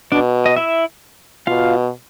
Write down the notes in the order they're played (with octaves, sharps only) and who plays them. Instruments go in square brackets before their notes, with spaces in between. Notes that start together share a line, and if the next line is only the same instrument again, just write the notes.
[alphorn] B2 [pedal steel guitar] D4 D5
[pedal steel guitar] D#5
E4 E5
[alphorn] B2 [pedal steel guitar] F4 F5